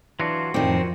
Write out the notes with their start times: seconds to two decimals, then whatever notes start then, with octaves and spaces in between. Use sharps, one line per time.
0.20 E3 F#3 D4 F4 F#4
0.54 F2 A2 D#3 F3 C4 D#4 D5